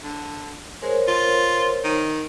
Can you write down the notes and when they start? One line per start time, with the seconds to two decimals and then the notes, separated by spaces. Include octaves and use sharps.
0.03 D3
0.82 G#3 A#4 C5 C#5
1.08 F4
1.84 D#3